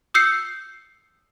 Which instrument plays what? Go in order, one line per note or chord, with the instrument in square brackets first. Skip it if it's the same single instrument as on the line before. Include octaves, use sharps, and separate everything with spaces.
[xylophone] D#6 E6 G6 C7 C#7